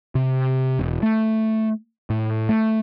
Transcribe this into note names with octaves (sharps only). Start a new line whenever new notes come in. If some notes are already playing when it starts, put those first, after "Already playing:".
C3
E1
A3
A2
A3